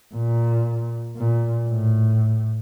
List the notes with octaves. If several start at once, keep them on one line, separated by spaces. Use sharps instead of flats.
A#2
A#2
A2